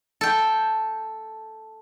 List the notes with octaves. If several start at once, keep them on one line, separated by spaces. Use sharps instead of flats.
A4 G5